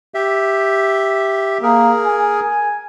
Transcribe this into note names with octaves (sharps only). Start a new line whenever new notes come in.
G4 E5
A#3 G#4 A#4
G#5